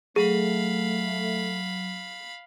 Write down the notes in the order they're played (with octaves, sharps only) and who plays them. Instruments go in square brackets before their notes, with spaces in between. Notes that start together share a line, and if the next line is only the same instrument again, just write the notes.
[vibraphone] F#3 [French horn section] A3 [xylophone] G#4 [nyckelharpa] F5 B5